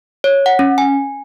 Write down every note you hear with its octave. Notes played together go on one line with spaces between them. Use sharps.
C#5
F#5
C#4
G#5